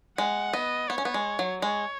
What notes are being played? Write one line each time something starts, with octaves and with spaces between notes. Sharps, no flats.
G#3 F#5
B3 D#5
B3 C#5
C#4
B3
G#3
F#3
G#3 C#5